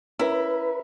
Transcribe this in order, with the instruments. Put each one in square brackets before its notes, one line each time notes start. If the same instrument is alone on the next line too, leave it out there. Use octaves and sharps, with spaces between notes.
[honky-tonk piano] C#4 A#4 E5 [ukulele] E4 [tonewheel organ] B4